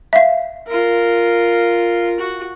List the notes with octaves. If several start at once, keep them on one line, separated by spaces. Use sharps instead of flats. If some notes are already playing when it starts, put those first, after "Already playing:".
E5 F5
F4 A#4
F#4